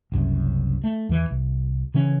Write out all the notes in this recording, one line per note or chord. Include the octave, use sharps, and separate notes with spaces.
F#1 C2 F#2
A3
E2 E3
C2
C#3 E3 C#4